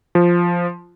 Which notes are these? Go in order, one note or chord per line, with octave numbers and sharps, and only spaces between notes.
F3